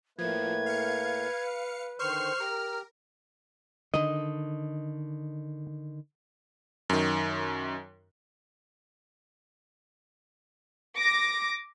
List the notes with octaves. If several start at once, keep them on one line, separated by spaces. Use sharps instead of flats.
A2 F3 A3 A#3 B4 G#6
F5 C#7
D3 D#3 C5 C#6 F6 C7
G4 A#4
D3 D#3 D#5
F#2 D#3
D6 A#6